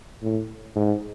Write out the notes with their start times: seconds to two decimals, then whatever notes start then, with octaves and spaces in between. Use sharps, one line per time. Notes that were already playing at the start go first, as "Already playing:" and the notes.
0.22 A2
0.76 G#2